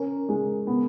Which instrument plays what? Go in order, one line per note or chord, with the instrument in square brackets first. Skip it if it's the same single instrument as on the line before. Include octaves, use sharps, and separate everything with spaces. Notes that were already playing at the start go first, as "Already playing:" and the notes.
Already playing: [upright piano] C#4 [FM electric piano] A#4
[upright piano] G#3
B3